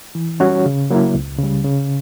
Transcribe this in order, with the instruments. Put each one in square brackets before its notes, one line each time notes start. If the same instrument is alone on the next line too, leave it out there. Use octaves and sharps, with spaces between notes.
[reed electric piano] E3
G3 C#4 F#4 C#5
C#3
F#3 A#3 E4
C#2
C#3 G3
C#3